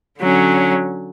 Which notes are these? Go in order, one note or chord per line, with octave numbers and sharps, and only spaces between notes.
D3 F#3 C#4